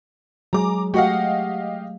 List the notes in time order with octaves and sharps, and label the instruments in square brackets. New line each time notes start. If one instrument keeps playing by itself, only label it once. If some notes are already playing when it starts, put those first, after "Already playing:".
[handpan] F#3 G#3 G#4 [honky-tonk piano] A#5 D6
[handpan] A3 [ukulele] F#4 F#5 [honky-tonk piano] G4 D#5 F5